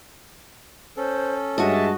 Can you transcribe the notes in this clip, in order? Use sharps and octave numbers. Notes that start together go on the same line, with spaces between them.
C#4 A4 C5
G2 G#3 F#4 D#5 E5 A5